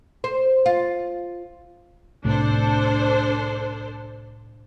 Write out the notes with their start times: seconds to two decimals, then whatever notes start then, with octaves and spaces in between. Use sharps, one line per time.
0.24 C5
0.66 F4
2.25 C2 A2 D4 A4 C5